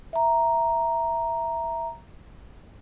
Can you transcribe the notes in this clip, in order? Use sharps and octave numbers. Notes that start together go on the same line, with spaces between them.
E5 A#5